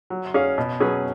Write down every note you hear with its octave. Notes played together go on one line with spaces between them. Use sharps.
F#3
C#4 G#4 C#5 F5
B2
F#3 C#4 G#4 B4